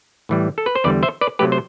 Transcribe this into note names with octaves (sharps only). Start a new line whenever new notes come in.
A2 E3 G3
A4
B4
C5
E2 D3 G3 B4 D5
C5 E5
B4 D5
C3 F#3 A3 G4 B4
C5